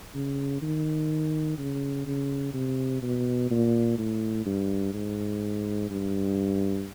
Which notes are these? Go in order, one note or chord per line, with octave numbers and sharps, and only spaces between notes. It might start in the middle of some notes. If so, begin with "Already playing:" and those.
C#3
D#3
C#3
C#3
C3
B2
A#2
A2
G2
G#2
G2